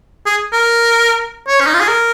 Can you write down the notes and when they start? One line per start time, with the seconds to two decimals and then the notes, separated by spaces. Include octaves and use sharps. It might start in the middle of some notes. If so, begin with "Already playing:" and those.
0.26 G#4
0.52 A#4
1.48 C#5
1.60 C#4
1.67 D#4
1.74 F4
1.80 G#4
1.88 A#4